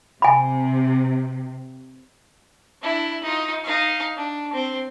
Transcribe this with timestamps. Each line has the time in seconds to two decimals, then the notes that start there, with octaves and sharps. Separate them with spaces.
0.22 C3 G#5 B5
2.82 D4 E4
3.23 D#4 F4
3.64 D#4 F5
4.17 D4
4.53 C4